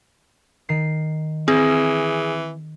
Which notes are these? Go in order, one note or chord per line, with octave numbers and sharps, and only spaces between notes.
D#3 C7
E3 C4 G#4